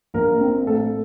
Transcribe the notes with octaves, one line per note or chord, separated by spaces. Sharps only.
A#1 A#4
C4
A2 A4